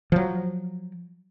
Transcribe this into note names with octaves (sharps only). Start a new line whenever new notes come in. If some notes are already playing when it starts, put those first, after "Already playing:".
F3 F#3